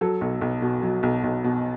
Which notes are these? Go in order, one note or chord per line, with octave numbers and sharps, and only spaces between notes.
F#3 A4
B1
B1
B2
F#3
B1
B1
B2